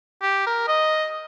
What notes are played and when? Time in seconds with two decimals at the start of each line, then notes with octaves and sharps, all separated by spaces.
0.22 G4
0.47 A#4
0.68 D#5